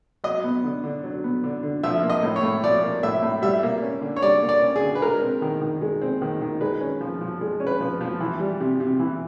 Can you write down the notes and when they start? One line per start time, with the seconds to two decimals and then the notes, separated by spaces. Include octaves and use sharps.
0.24 F#3 D#5
0.44 B3
0.64 D3
0.84 D3
1.04 F#3
1.24 B3
1.44 D3
1.63 D3
1.83 F3 E5
2.03 A#3
2.10 D#5
2.23 A2
2.36 C#5
2.43 A2
2.64 F3 D5
2.83 A#3
3.03 A2 E5
3.23 A2
3.42 G3 E5
3.63 A#3
3.82 C#4
4.02 D3
4.16 C#5
4.22 G3 D5
4.42 A#3
4.49 D5
4.62 C#4
4.76 G#4
4.82 D3
4.95 B4
5.02 G#3 A#4
5.22 C4
5.42 D#3
5.61 D#3
5.82 G#3
6.01 C4
6.22 D#3
6.41 D#3
6.61 G#3 B4
6.81 C#4
7.01 F3
7.21 F3
7.41 G#3
7.60 C#4
7.67 B4
7.80 F3
8.01 F3
8.20 E3
8.40 G3
8.60 C3
8.80 C3
8.99 E3